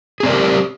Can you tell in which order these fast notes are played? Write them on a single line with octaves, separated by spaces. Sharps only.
G#4 C4 D5 A#4 G4